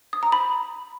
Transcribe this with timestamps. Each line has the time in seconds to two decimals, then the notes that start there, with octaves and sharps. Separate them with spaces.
0.13 D#6
0.23 A#5
0.32 B5